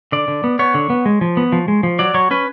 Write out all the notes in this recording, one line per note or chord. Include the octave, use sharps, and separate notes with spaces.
D3 D5
D3
B3
B3 C#5
D3
B3
G#3
F3
B3
F3
G#3
F3
F#3 D5
F#3 C#5
C#4 B4